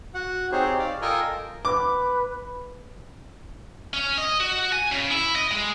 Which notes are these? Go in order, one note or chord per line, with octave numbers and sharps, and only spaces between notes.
F#4 F#5
C4 D#4 G4 G#4 C5 C#5
D5 F5
F4 A4 A#4 D#5 G5 G#5
B4 D6
C#4
D#5
F#4
G#5
C#3
E4
D#5
G#3